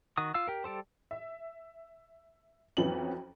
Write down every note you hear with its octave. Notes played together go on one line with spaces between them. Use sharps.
D#3 F#4 D#6
F4 F5 E6
G4 A#4
G3 G4 A4 C5
E5
F2 E3 F#3 B3 C#4 F#7